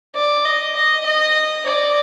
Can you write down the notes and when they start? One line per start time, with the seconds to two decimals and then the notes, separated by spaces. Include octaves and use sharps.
0.15 D5
0.45 D#5
0.76 D#5
1.06 D#5
1.66 D5